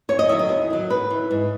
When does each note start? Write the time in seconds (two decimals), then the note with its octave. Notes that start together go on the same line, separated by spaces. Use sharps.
0.09 E2 C#5
0.19 D#5
0.29 D#3 E5
0.32 F#3
0.39 D#5
0.49 E2
0.70 D#3 F#3
0.90 G#2 B4
1.10 E3
1.31 G#2